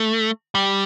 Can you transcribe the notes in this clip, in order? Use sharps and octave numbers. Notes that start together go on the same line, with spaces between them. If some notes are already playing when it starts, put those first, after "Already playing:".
Already playing: A3
G3